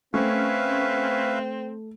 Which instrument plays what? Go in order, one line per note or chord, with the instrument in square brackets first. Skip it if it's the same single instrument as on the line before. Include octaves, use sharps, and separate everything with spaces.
[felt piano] A3 [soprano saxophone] C4 [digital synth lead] C#4 [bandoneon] B4 E5 F5